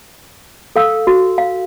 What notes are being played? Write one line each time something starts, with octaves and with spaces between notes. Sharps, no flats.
A4 F5 E6
F#4
F5